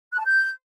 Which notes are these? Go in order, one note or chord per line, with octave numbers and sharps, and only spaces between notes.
F#6
A5
G6